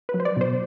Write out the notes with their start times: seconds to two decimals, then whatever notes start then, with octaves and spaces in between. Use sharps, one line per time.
0.09 B4
0.14 F#3
0.20 C5
0.25 D5
0.37 B2 C5